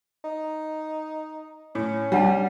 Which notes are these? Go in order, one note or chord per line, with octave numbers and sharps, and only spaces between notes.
D#4
A2 C#4
G3 D4 F#5 A5